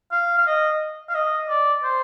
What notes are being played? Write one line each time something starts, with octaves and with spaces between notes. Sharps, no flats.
F5
F5
D#5
F5
D#5
D5
C5